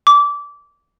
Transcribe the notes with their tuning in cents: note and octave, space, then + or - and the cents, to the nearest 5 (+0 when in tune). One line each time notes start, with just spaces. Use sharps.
D6 -20